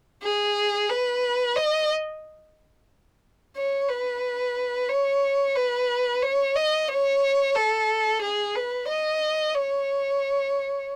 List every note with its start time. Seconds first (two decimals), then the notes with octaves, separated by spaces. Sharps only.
0.23 G#4
0.90 B4
1.56 D#5
3.57 C#5
3.89 B4
4.89 C#5
5.56 B4
6.22 C#5
6.56 D#5
6.89 C#5
7.55 A4
8.22 G#4
8.55 B4
8.88 D#5
9.55 C#5